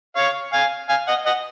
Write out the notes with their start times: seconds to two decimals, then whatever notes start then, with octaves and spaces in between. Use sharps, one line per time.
0.16 C#5 F5
0.53 F5 G#5
0.89 F5 G#5
1.08 D#5 F#5
1.26 D#5 F#5